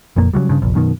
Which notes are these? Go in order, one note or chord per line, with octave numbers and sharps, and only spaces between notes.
F#1 F2 A#2 A#3
C#3 E3 F#3 G3
G2 C#3
F1 A#1
F#2 B2 D#3